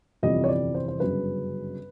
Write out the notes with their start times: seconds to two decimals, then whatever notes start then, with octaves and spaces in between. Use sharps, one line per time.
0.23 G1 F2 C3 E3 G3 D#5
0.44 C#5
0.49 D5
0.75 C5
0.88 C5
1.00 G1 F#2 C#3 B4